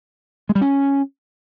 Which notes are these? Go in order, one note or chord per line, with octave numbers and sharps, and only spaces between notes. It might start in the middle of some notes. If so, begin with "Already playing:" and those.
G#3
G3
C#4